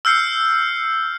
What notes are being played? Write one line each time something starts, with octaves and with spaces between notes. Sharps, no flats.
E6 F6 G6 C7 C#7